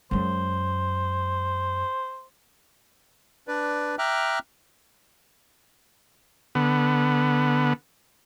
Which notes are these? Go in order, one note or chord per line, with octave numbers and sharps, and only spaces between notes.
F#2 G#3 C5
D4 B4 D5
E5 G5 A#5 D6 F6 F#6
D3 B3